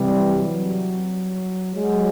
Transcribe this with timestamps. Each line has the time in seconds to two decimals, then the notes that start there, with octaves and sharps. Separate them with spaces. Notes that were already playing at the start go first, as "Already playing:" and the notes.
Already playing: C3 E3 G3
0.34 F#3
1.75 F#3 G#3